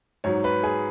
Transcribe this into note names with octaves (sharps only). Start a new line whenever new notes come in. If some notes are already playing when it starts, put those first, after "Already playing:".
G#2 F#3 C#5
B4
G#4